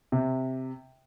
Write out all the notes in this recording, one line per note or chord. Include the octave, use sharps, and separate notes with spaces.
C3